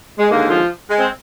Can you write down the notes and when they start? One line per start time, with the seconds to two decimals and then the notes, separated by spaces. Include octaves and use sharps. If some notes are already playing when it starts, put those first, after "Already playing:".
0.19 G#3
0.31 D#2 D3 G#3 A#3
0.50 F3 F4
0.89 G#3
0.99 C4